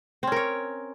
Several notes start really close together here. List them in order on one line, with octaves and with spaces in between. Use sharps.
C4 C#4 A#4 C#5